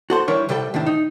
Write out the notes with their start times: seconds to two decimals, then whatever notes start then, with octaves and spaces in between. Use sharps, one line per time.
0.10 F#4 A4 C5
0.28 E3 G3 D4 A#4 B4 C#5
0.49 C2 C3 G3 A4 B4 G5
0.74 A2 C3 D#3 D4
0.86 D#4